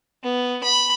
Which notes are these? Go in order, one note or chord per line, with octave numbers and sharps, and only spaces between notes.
B3
B5